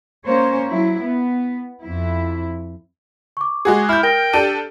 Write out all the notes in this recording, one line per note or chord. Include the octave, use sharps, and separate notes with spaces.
A#3 C#4 C5 C#5
F#3 E4
B3
F2 E4
C#6 D6
G#3 F#4 G#4
E4 F6 G6
A#4 G5 A#6
D4 G4 A4 D#7